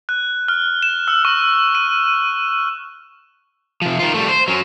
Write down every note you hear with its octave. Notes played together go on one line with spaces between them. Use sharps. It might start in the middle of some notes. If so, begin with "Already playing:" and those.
F#6
F6
E7
E6
C#6
D#7
C3 F3
D#3 F4
G3 A3
C5
F#3 C#4